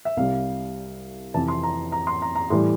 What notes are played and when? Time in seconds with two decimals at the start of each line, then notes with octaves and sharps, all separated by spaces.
0.05 E5
0.17 C2 C3 G3 F5
1.34 F2 C3 E3 A5
1.48 C6
1.63 A#5
1.92 A#5
2.07 C6
2.22 A#5
2.35 A#5
2.50 A2 E3 G3 C6